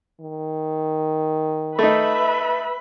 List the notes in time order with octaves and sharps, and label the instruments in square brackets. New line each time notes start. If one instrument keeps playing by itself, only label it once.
[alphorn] D#3
[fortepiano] A3 D#4 [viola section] B4 E5 B5